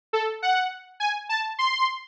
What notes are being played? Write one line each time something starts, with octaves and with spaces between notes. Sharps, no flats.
A4
F#5
G#5
A5
C6